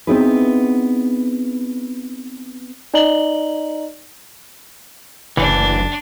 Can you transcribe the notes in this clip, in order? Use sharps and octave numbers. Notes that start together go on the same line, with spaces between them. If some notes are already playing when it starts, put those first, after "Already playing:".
B3 C4 D#4 E4 G#4 B4
D#4 D5 D#5 A#5 F#7 G7
F#1 D2 E3 D4